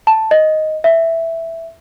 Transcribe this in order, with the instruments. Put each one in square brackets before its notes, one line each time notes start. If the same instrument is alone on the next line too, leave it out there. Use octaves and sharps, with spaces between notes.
[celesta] A5
D#5
E5